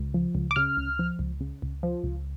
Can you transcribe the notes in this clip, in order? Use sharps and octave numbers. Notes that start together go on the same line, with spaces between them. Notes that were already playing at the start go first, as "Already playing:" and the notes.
Already playing: C#2
F3
C#2
D6
C#3 F6
C#2
F3
C#2
C#3
C#2
F3
C#2